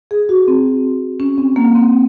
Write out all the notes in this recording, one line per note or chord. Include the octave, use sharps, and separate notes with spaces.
G#4
F#4
C4
C#4
C4
A#3
C4
C4